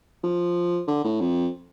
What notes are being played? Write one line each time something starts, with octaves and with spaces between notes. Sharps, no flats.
F3
D3
A2
F2